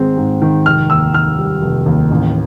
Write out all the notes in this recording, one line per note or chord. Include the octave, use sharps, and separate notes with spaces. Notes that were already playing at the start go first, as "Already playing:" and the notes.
Already playing: G#2 D#3 G#3 C4
G#2
D#3
F1 F6
D#2 E6
D#3 F6
G3
F1
D#2
A1